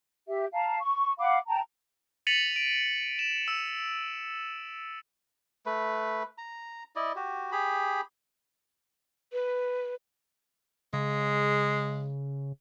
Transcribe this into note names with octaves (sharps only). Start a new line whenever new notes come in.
G4 E5
F5 A5 A#5
C#6
F5 F#5 B5 D6
G5 A5 A#5
A6 B6 C#7 D#7 F7 F#7
D7
E7
E6
A3 B4
A#5
E4 D5 D#5
F#4 G4
G4 G#4 B5
B4
C#3 G#3